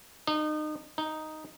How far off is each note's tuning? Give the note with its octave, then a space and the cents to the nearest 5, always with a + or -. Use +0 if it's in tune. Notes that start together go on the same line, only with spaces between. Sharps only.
D#4 -30
D#4 +0